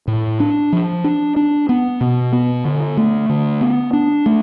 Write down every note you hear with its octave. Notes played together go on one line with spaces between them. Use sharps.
A2
D4
F3
D4
D4
B3
B2
B3
D3
A3
D3
B3
D4
A3